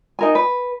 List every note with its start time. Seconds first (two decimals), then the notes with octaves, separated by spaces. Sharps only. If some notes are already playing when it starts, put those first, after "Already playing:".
0.19 D#4 A#4 G#5
0.35 B4